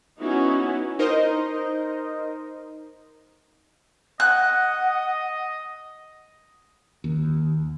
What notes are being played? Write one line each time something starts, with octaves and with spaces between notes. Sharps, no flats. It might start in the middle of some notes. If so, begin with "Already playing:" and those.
B3 C#4 D#4 E4 F#4
D#4 A#4 C5 D#5
D#5 F#5 F#6
D#2